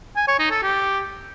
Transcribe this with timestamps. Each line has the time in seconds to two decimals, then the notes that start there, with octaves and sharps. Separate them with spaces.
0.16 G#5
0.28 C#5
0.39 D#4
0.51 A4
0.62 G4